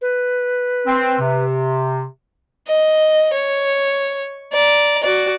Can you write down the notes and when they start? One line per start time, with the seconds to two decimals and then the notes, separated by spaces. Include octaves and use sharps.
0.01 B4
0.87 C4
1.19 C3
2.67 D#5
3.33 C#5
4.53 D5 A#5
5.03 F#4 D5